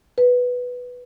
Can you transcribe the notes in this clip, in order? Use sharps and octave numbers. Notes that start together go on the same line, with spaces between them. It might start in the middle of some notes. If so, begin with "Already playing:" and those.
B4